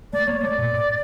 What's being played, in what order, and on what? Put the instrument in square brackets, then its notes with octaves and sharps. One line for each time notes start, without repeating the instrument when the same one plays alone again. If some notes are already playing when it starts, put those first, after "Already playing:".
[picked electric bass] A3 [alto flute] D5
[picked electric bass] A#3 [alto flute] C#5
[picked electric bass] A3 [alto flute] D5
[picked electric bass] A#2
A2